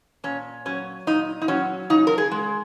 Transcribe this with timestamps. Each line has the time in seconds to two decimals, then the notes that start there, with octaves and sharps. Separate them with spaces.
0.24 A#2 C#4
0.65 F#3 C#4
1.07 A#2 D#4
1.41 D#4
1.48 F#3 C#4
1.90 C#3 D#4
2.07 A#4
2.18 G#4
2.31 G#3